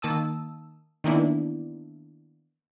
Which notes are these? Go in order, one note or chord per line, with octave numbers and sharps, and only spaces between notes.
D#3 A#3 A5 D#6 E6
D#3 E3 A#3 B3 D4 E4